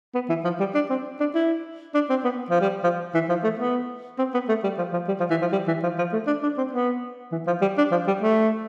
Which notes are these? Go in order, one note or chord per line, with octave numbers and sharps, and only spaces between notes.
B3
E3
F3
G3
D4
C4
D4
E4
D4
C4
B3
F3
G3
F3
E3
F3
A3
B3
C4
B3
A3
G3
F3
F3
G3
F3
E3
F3
G3
E3
F3
F3
A3
D4
D4
C4
B3
E3
F3
G3
D4
F3
G3
A3